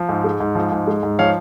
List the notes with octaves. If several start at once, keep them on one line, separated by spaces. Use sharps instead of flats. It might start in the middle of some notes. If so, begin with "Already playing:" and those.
Already playing: F3
G#2
G#3
G#2
F3
G#2
G#3
G#2
F3 C#5 F5